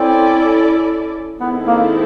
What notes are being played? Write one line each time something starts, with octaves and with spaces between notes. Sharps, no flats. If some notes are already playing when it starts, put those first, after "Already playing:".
Already playing: C4 C#4 E4 A4 D5
D#3 G#3 B3 C4 E4 A4
A#3